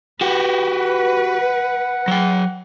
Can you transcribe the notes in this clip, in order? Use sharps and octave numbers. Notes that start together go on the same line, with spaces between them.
F#4 G4 B4
F#5
F#3 G5